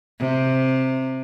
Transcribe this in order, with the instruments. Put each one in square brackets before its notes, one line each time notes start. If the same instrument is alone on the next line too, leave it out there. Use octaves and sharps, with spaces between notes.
[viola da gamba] C3